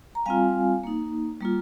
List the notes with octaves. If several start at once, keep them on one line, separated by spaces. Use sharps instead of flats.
A#5
G3 C4 F4 F5 G#5
A#3 D#4
G3 A#3 F4